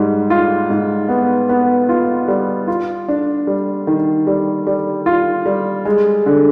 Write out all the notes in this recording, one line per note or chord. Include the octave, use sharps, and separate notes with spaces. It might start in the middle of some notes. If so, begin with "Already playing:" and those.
Already playing: G#2 G3
F4
G#2
B3
B3
F4
G3
F4
D4
G3
D#3
G3
G3
F4
G3
G#3
D3